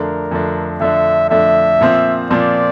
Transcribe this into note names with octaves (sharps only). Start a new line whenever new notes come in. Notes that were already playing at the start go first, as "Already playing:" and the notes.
Already playing: F2 D3 A3 D4 A#4
F2 D3 A3 D4
F2 D3 A3 D4 E5
F2 D3 A3 D4 E5
A#2 F3 C4
A#2 F3 C4 D5